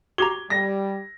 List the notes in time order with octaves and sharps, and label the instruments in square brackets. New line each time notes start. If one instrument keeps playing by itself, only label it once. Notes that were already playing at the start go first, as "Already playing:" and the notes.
[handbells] F#4 G4 A#5 [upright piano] G#6 G7
[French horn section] G3 [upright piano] A#6